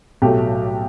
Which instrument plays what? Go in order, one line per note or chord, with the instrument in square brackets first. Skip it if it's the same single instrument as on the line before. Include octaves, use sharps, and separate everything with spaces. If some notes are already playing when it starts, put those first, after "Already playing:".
[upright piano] B1 A2 F#3 A3 G4